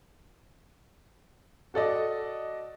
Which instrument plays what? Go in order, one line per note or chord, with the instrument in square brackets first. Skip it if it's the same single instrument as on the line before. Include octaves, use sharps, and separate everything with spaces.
[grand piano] F#4 A4 D5 D#5